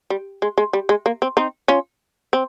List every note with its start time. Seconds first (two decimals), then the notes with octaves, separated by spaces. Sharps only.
0.10 G3
0.42 G#3
0.58 G#3
0.73 G3
0.89 G#3
1.06 A#3
1.22 C4
1.37 C4 D#4
1.68 C#4 F4
2.33 C4